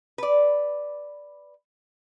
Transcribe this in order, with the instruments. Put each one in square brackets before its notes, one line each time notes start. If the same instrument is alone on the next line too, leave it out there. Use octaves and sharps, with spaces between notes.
[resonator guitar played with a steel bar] B4 D5